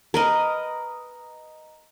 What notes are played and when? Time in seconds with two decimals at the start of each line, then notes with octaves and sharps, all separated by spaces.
0.14 A#4 B4 D#5